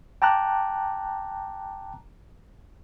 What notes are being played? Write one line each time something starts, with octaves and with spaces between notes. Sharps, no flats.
G5 A5 A#5 D6 F#6